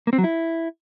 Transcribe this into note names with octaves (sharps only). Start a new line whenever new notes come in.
A#3
C4
F#3
E4